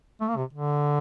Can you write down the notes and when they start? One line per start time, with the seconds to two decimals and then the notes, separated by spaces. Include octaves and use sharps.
0.21 A3
0.29 A#3
0.37 C3
0.53 D3